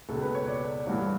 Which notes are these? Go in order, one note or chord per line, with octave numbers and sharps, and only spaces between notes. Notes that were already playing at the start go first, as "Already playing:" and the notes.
C#2 B2 A4
B4
C#5
D5
A1 G2 E3